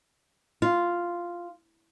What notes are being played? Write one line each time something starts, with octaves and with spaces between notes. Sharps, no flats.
F4